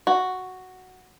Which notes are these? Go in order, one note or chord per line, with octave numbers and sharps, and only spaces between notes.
F#4